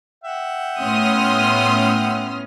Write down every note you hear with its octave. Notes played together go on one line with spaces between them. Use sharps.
E5 F#5 G5
A2 B3 C#4 C6 D#6 F6